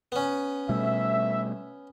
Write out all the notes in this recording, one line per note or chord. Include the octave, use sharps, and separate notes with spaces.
B3 C#4
B2 G3 A3 E5